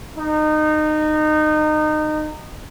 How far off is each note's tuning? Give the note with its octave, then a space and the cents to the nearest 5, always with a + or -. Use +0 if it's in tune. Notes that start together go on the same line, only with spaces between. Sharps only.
D#4 -25